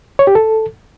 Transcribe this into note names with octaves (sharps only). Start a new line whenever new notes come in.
C#5
G4
A4